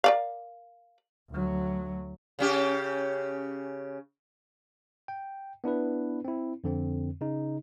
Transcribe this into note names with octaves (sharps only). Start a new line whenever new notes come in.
A#4 D5 F5
D2 F#3
C#3 C#4 G4
G5
B3 D4 E4 B4
C4 E4
F2 D3 C4
C#3 D#4